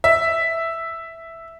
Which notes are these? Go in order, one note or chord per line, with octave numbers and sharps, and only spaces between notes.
E5